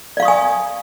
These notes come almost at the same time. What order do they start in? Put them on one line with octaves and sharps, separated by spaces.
D5 F5 C#6 D#6 G#5